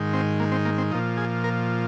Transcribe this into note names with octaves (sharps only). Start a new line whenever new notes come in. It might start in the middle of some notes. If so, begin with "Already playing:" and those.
Already playing: G#2 D#3
C4
A#3
C4
A#3
C4
A#2 F3 D#4
G#4
A#4